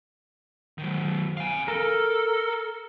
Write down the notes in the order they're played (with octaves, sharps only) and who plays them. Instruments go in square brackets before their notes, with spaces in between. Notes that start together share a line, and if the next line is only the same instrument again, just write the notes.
[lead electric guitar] D#3 F#3
F5 G#5
[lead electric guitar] A4 [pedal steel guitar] A#4